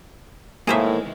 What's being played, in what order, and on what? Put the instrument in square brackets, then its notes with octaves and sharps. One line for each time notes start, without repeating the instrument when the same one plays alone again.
[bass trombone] A2 [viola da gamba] D#3 E3 G#3 [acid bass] A#3 [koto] G#4 C5 E5